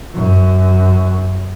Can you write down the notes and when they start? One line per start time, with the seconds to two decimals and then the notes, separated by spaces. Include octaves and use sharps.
0.15 F#2